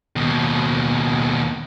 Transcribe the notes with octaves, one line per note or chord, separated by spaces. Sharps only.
D#2 B2